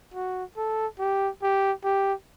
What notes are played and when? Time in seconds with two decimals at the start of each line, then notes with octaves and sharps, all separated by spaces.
0.14 F#4
0.57 A4
0.99 G4
1.42 G4
1.84 G4